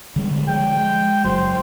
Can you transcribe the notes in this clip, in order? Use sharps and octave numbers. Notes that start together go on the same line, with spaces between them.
D3 G3 G#3
F3 G#3 G5
G#3
F#1 F#3 C5